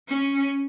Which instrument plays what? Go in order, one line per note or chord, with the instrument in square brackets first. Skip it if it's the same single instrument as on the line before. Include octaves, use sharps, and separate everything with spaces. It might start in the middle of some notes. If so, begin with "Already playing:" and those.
[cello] C#4